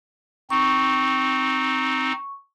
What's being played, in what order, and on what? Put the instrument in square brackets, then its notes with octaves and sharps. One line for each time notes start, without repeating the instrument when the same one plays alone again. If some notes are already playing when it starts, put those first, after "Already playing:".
[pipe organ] C4 D#4 [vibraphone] C#6